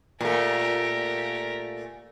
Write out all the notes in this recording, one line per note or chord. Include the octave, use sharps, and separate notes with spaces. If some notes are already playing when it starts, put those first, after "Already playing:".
A#2 A3 G4 A#4